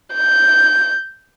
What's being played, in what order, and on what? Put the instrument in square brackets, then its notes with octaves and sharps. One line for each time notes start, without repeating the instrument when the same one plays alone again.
[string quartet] G6